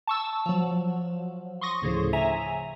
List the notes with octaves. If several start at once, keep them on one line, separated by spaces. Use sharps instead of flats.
A5 C#6 E6
F3 F#3
C6 C#6 D#6 A#6
D2 A2 C#3 F3
E5 G#5 A#5